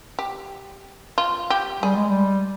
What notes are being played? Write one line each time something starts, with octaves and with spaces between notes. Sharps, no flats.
G4
F4
G4
G3 G#4
G#3
G3